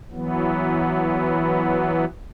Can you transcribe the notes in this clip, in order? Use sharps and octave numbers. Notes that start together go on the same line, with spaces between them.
E3 F#3 B3